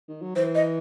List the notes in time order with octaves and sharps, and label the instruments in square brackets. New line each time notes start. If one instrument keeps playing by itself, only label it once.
[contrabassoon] D#3
F#3
[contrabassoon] E3 [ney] C5
[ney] D#5